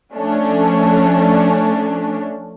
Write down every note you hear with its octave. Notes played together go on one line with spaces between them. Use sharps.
F3 A3 C#4 D4